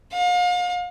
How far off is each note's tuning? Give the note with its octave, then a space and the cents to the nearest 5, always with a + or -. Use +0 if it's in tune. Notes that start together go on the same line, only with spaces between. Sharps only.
F5 +40